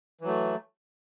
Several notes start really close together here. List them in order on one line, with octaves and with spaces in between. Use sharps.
E3 F#3 A3